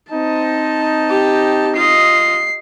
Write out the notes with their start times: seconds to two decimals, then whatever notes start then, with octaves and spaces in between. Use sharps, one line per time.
0.12 C4 D#4 A5
1.09 G4
1.76 F4 D#5 C7